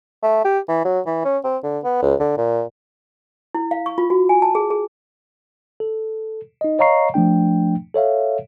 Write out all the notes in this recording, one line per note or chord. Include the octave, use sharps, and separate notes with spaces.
A3
G4
E3
F#3
E3
C#4
C4
D3
B3
C#2
D3
A#2
E4
F5
C#6
F4
F#4
G#5
A5
G#4
G#4
A4
D#4 D#5
C#5 D#5 F5 A#5 C#6 C7
F3 A3 D4 G5
A4 C#5 E5 F5